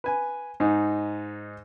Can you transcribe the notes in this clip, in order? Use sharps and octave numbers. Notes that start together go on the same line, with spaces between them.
B4 G#5
G#2 D#4